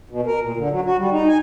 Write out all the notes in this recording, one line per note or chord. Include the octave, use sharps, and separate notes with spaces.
B2
A#4
A#2
D3
F#3
F#4
G3
D#4
G#5